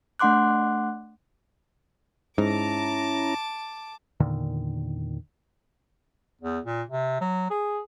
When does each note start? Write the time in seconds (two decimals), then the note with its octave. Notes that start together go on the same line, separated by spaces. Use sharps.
0.19 A3 D4 F#5 C6 D6 F#6
2.38 G#2 C#4 E4 A5 A#5 D6
4.20 E2 A#2 D3 D#3
6.41 E2
6.65 A#2
6.89 C3
7.21 F#3
7.50 G#4